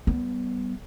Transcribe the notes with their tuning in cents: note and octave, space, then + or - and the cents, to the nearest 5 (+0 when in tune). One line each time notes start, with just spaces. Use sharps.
G3 -25 B3 +0